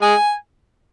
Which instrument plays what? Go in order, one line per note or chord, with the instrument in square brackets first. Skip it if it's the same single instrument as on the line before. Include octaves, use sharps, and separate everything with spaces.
[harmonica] G#3 G#4 [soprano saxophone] G#5